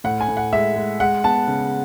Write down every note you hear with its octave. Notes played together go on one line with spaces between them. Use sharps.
A2 F#5
G#5
A2
F#5
G#3 E5
G#3
G#3 F#5
B3 A5
C#3